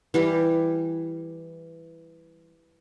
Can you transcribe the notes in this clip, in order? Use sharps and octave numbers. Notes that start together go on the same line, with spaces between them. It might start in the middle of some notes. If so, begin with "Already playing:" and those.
E3 G3 G4